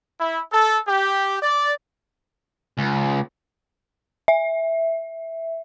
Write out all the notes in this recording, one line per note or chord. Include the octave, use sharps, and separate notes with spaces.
E4
A4
G4
D5
C#2
E5